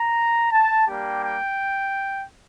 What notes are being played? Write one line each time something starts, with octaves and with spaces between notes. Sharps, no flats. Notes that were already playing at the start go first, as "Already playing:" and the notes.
Already playing: A#5
A5
G3 A#3 D4 G4 G5
G5